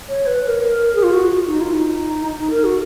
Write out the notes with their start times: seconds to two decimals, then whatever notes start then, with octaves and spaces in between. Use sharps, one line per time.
0.09 C#5
0.27 B4
0.44 B4
0.48 A#4
0.95 G#4
1.03 F4
1.13 F#4
1.47 D#4
1.61 F4
1.74 D#4
2.50 A#4
2.64 F#4